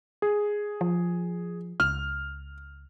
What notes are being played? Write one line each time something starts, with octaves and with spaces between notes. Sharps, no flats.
G#4
F3
C#2 F6